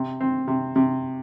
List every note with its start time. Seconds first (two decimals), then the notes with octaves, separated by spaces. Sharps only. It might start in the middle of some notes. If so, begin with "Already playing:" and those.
Already playing: C3
0.21 C4
0.48 C3
0.76 C3